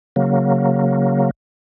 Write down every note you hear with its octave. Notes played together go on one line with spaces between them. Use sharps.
C#3 F#3 A#3